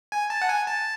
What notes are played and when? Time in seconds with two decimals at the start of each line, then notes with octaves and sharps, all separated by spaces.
0.12 G#5
0.30 A5
0.42 F#5
0.49 G#5
0.67 A5